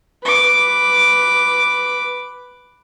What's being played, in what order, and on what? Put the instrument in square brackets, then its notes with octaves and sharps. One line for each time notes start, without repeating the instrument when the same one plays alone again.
[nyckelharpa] B4 D6